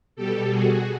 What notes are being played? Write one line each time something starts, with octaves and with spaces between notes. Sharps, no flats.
B2 G3 G4 A4
F#4 G#4